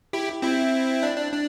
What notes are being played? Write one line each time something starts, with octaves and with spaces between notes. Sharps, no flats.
E4 G4
C4 E4
D4
D4
D4